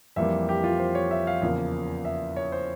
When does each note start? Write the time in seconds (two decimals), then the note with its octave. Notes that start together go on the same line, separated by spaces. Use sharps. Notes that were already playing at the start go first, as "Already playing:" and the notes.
0.16 F2 E3 G3 A#3 E5
0.49 G4
0.64 F4
0.79 C5
0.95 C#5
1.11 E5
1.27 F5
1.42 E2 C#3 F3 A#3
2.05 E5
2.36 C#5
2.52 C5